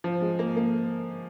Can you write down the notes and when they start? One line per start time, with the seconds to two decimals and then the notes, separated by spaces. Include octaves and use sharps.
0.04 F3
0.22 G#3
0.39 A#3
0.57 A#3